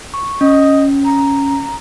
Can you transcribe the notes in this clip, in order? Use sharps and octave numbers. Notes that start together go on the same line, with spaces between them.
C#6
C#4 D#5
A#5